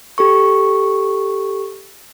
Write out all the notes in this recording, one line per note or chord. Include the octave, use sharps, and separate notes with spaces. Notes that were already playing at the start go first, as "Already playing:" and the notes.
G4 A4 C#6